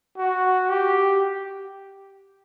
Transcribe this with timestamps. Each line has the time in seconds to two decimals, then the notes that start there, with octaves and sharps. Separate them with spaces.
0.18 F#4
0.70 G4